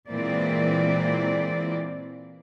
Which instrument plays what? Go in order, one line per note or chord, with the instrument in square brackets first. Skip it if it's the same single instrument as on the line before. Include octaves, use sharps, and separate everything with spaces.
[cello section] A#2 E3 G#3 A#3 C4 D5